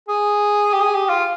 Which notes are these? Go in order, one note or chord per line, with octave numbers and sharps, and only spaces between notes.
G#4
G4
G#4
G4
F4